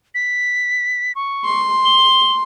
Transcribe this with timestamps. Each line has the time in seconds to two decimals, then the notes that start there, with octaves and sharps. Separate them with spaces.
0.14 B6
1.15 C#6
1.45 C6
1.85 G7